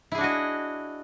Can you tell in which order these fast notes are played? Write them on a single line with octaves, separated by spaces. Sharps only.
E4 G#4 D4 F#4 D#5